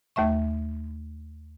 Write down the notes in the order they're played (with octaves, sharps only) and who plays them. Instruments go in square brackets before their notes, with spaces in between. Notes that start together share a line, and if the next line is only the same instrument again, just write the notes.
[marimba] D#2 A3 E5 C#6